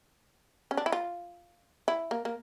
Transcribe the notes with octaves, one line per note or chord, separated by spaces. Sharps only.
C#4
D4
E4
F4
E4
A#3
A#3